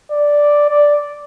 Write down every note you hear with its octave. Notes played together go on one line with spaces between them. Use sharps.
D5
D5